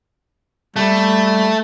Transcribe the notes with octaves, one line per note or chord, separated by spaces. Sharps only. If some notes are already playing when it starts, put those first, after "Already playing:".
G3 A3